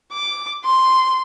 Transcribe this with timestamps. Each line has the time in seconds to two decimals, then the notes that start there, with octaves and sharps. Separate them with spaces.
0.13 D6
0.64 C6